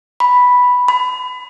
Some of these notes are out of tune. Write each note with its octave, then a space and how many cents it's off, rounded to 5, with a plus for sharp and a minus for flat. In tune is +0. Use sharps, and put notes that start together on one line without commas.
B5 +0
B5 +30